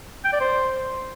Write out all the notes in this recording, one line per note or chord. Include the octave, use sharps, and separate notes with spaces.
G5
D5
C5